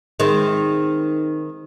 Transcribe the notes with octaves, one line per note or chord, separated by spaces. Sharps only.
D#3 G#3 C4